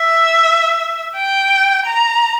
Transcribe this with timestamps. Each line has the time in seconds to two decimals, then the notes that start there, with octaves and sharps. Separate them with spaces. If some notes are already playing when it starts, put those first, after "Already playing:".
Already playing: E5
1.16 G5
1.86 A#5